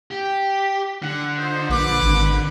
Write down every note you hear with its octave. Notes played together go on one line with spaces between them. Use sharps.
G4
D3 F#5
D#4 F4 C5
A#1 B4 D6
G#1